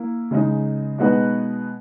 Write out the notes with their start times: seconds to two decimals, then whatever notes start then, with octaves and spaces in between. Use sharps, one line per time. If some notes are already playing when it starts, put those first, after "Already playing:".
Already playing: A#3 E4
0.31 C#3 G#3 D#4
0.98 B2 G#3 D#4 F#4 B4